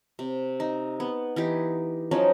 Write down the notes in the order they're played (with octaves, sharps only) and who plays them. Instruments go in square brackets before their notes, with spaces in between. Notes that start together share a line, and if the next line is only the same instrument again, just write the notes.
[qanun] C3
D#4
B3
E3 D#4 G4
F3 F#3 C#4 D#4